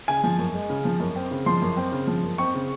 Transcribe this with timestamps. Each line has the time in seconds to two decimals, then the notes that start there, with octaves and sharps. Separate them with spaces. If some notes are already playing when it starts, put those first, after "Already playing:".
0.08 C#3 G#5
0.24 F3
0.39 F#2
0.54 G#3
0.70 C#3
0.85 F3
1.00 F#2
1.16 C4
1.31 C#3
1.46 F3 C6
1.62 F#2
1.77 C4
1.92 C#3
2.07 F3
2.23 F#2
2.38 C4 C#6
2.54 C#3